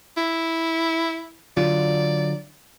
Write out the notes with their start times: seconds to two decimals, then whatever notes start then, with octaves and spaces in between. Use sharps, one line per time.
0.17 E4
1.57 D3 F#3 F4 D5